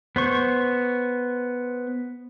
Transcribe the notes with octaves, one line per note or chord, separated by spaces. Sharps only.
B3 C5 C#6